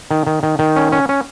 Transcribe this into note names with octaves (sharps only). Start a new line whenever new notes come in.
D#3
D#3
D#3
D#3
C#4
C#4
C#4